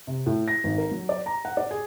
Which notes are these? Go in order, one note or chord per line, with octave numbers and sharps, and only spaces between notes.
C3
A2
A#6
G#1
A#4
F#3
D5
A#5
F#5
D5
G#4